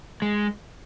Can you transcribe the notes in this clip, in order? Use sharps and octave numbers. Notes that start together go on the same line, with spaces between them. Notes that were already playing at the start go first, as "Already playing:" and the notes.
G#3